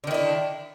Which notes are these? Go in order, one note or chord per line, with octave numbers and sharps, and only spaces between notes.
D3 D#3 D4 E4